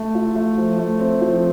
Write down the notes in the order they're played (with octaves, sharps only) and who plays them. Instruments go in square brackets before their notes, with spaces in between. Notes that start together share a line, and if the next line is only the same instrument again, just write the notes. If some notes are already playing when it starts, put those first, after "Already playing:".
Already playing: [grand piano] A3 A4
F4
A3
F3
A3
C4
F3